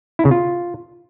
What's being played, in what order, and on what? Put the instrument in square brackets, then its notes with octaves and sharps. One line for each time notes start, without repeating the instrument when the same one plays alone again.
[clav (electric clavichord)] E4
C#3
F4